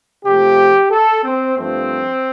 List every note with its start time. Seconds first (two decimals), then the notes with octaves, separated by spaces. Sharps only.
0.25 C3 F3 A3 G4
0.91 A4
1.23 C4
1.56 G2 F3 A3 C4